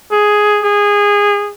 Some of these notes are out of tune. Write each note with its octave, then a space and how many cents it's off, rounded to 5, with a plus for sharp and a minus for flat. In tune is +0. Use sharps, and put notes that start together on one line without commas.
G#4 +5
G#4 -20